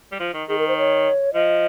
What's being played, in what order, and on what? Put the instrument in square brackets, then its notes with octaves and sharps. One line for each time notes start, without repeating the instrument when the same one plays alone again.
[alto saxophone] G3
F3
D#3
[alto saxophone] D#3 [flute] G#4
[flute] A#4
C5
C#5
[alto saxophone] F3 [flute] D#5